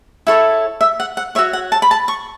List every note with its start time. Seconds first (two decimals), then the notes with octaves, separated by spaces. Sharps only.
0.27 E4 A4 C#5
0.81 E5
1.00 F#5
1.17 F#5
1.35 C#5 E5
1.38 F#4
1.53 F#5
1.72 A5
1.82 B5
1.91 A5
2.08 C#6